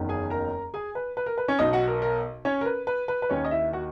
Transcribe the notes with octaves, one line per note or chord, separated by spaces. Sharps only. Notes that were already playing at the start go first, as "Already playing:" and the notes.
Already playing: F#1 E2 D#3
G#4 G#5
A#4 A#5
G#4 G#5
B4
B4
A#4
B4
C#4 C#5
B1 B2 D#4 D#5
F#4 F#5
A#4
A#4
C#4 C#5
A#4
B4
B4
B4
B4
D#2 D#3 C#4 C#5
D#5
E4 E5
F#4 F#5